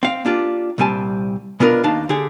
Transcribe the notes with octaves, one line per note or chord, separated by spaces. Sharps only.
C4 F5
A#3 D4 F4 G4
C2 A#2 G3 C4 G#5 A5
B2 B3 D4 F4 A#4
D#2 D4 D#4 F5 A5
D3 G4 G#4